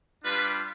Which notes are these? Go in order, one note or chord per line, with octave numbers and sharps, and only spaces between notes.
G3 D4 F4 B4